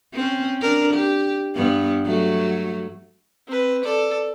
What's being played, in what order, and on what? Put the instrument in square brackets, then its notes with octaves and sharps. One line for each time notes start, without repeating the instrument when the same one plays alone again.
[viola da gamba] C4 C#4
D4 A#4
G4
G2 B3
F#3 A3
[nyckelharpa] C4 B4
A4 D5